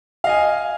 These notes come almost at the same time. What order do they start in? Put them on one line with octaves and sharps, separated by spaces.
F5 D#5 G#5